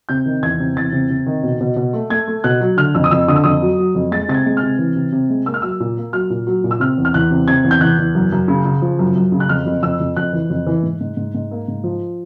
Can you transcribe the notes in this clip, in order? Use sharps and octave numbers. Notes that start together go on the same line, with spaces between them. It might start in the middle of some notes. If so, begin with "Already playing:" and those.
C3 G6
D#3
E2 G#6
C3
E2 A6
C3
C3
D#3
B2
B2
B2
A3
A3 G#6
A3
B2 F#6
F#3
D3 F6
F2 E6
D#6
F2 E6
D3 D#6
E6
F2 D#6
F#3
F#3
F2
G#3 A6
C3 A6
G#6
G#3
F6
C3
E3
C3
C3
G#3
A#3 E6
F6
F#3 E6
A#2
A#3
F#3 F6
A#2
F#3
A#2
E6
C3 F6
E2
F6
E2 F#6
C3
C3 G#6
E2
G6
E2 F#6
E2
F#2
F#2
C#3
C#3
F3
F#2
F#2
C#3
F#6
F2 F6
F2
F2 E6
F2
F2 F#6
E3
F2
E3
G#2
G#2
G#2
G#2
A#3
G#2
F3